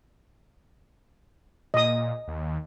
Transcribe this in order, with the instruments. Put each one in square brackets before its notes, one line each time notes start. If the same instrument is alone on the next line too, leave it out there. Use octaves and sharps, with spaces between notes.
[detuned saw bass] A#2 [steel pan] D#5 D#6
[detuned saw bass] D#2